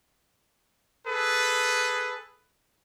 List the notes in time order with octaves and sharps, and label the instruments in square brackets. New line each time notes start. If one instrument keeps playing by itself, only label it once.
[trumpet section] G#4 A4 B4